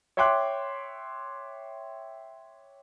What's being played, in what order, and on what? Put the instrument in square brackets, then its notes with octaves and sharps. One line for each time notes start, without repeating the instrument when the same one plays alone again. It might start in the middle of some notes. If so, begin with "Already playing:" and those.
[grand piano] C#5 E5 G5 C6 D6 F#6